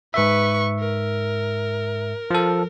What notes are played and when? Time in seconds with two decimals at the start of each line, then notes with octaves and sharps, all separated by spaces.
0.14 G#2 B4 E5 C#6
0.80 A#4
2.31 F3 A4